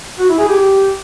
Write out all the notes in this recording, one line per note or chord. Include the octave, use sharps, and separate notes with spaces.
F#4
E4
G#4
G4